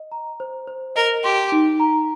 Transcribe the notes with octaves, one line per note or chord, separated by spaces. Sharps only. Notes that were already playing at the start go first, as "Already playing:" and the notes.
Already playing: D#5
A#5
C5
C5
A#4 D#5
G4 C6
D#4
A#5